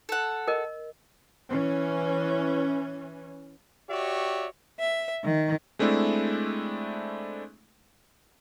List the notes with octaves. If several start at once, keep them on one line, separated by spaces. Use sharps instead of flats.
A4 F#5
A#4 D#5
E3 C#4
F#4 G4 C#5 D5 E5
E5
D#3
G#3 A3 C4 D4 E4